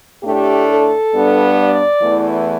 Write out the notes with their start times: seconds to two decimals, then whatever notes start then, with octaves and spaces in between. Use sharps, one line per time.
0.23 A2 A3 D4 G4
0.68 A4
1.12 G2 G3 B3 D4
1.57 D5
2.01 E2 E3 A3